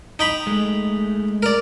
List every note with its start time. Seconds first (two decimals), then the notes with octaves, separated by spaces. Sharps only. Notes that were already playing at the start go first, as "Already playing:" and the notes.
0.19 D#4 G5 B5
0.47 G#3 A3
1.43 A#4 D5